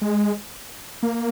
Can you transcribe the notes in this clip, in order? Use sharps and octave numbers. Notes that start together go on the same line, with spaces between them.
G#3
A#3